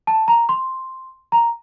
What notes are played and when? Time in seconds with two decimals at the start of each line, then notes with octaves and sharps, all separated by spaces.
0.07 A5
0.28 A#5
0.49 C6
1.32 A#5